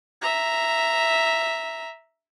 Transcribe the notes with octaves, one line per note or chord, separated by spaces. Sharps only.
E5 A#5